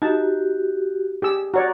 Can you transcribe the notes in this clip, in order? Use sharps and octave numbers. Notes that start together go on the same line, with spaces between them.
D#4 F#4 G4 A5
G4 G#4 E6
F#4 C#5 D5 A#5